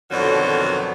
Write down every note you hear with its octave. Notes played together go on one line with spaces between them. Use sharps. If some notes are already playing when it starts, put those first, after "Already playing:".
F2 B2 D3 D#3 F#3